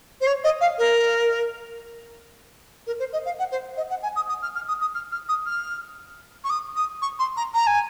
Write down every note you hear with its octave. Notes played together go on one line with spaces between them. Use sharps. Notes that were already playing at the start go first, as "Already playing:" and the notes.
C5
C#5
D#5
F5
A#4
A#4
C5
D#5
F5
F#5
C5
D#5
F#5
G#5
D#6
D#6
F6
F6
D#6
D#6
F6
F6
D#6
F6
C#6
D#6
D#6
C#6
C6
A#5
A#5
G#5